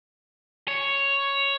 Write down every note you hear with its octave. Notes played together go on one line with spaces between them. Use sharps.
C#5